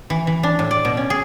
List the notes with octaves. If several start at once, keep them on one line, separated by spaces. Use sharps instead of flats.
E3
E3
D4
A2
D5
B2
C#4
G#4